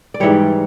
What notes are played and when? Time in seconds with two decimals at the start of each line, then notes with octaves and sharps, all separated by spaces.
0.14 D5
0.20 G#2 E3 G3 C#5